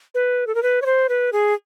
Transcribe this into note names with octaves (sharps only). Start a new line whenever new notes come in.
B4
A4
A#4
B4
C#5
C5
B4
G#4